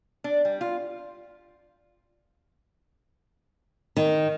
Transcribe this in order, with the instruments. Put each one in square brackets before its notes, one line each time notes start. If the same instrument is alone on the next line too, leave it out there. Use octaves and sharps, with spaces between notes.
[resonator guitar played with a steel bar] D4
G3
F4
[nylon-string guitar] D#3